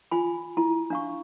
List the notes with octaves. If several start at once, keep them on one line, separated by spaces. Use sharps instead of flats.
F4 G#5 B5
E4
D4 F5 C#6